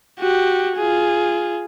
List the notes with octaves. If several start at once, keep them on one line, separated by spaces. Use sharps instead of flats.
F#4 G4
F4 G#4